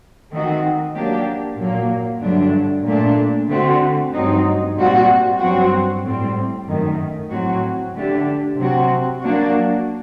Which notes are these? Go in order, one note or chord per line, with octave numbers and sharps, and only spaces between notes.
D#3 A3 C4 D#4 F#4
F#3 A#3 D4 G4
A#2 F#3 A#3
G2 D3 F#3 A3 D4
A#2 A3 D4
D3 A3 C4 F#4
G2 F#3 C4 D#4
A#2 G3 C4 F#4
G2 F#3 C4 F#4
A2 G3 C4
F#2 D#3 A3
A2 F#3 C4 F#4
D3 A3 D4 G4
C3 F#3 C4 F#4
F#3 A#3 D4 F#4